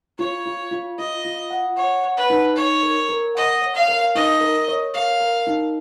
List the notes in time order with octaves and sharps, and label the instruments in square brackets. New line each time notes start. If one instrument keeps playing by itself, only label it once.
[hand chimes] F4 [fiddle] C#5
[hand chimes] F4
F4
[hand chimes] F4 [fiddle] D#5
[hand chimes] F4
F#5
[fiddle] C#5 [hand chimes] F#5
[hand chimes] F#5
[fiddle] B4
[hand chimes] D#4
[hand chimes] D#4 [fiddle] C#5
[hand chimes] A#4
A#4
[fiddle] D#5 [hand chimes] F#5
[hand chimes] C#5
[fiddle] F5
[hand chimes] A#4
[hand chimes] D#4 [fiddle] D#5
[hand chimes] A#4
C#5
[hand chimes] A#4 [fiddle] F5
[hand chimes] A#4
D#4